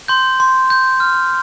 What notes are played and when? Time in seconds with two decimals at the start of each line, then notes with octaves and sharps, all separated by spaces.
0.08 C6 G6
0.40 C6
0.70 G6
1.00 F6